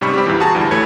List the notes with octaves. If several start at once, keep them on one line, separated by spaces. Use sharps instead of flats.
G#2 C3 G3 C#4 B5 C#6
G3 C4 G4
E2 G2 A#2 E3
F#4 G#4 A5 A#5
D2 G2 E3 G3
G#1 E3 A3 C#5 B5 G#6